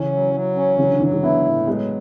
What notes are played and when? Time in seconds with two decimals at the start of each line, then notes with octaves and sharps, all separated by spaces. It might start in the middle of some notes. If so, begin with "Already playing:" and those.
Already playing: C#3 E3 C#4
0.11 F#3
0.34 F#3
0.55 C#4
0.78 C#3 E3 F#3
0.89 D3
1.00 C#3 E3 F#3
1.12 E3 G#3
1.23 B3 D4 E4
1.45 A2
1.67 F#3 G#3 B3